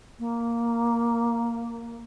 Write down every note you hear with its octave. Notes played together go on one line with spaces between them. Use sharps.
A#3